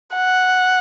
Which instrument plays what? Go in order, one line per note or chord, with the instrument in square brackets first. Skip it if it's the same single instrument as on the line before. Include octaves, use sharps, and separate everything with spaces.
[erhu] F#5